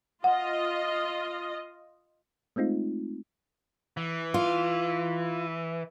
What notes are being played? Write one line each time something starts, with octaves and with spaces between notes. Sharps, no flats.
F4 D#5 F#5
G#3 A3 C4 D#4 F4
E3
F4